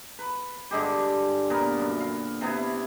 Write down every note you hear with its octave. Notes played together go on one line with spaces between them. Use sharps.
B4
G2 D3 G#3 G4
A#2 B3 A#4
F#2
F5
C3 B3 E4